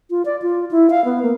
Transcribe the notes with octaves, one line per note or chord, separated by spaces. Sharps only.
F4
D5
F4
E4
F5
B3
A#3